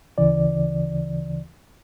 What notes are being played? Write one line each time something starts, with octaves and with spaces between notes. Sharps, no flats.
D2 C#3 E3 D5